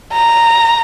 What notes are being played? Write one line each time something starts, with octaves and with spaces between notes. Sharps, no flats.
A#5